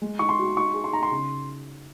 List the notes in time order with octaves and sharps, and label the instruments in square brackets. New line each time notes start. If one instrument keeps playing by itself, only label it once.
[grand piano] G#3
[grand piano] D#4 [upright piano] C#6
[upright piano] C6
[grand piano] F#4
[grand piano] D#4 [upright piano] C#6
[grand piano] G#4
[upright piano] C6
[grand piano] D#4 [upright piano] A#5
[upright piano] C6
[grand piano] C#3